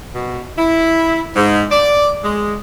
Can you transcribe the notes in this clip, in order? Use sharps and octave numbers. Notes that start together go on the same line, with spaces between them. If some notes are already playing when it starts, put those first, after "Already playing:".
B2
E4
G#2
D5
G#3